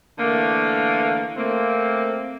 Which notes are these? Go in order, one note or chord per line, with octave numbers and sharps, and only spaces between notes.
D3 E3 A3 A#3
A3 A#3 C4